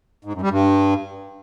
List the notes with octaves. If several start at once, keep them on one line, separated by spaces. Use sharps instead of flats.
G#2
F#2
G3
G2